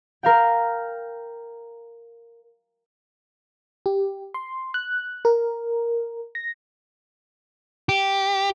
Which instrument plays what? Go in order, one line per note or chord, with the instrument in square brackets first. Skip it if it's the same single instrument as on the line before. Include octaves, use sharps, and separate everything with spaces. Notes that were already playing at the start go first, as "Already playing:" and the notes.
[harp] A#4 F5 G5
[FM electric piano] G4
C6
F#6
A#4
A#6
[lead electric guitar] G4